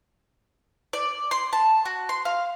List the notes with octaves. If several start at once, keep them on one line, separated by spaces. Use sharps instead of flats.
D5
C6
A5
F#4
C6
F5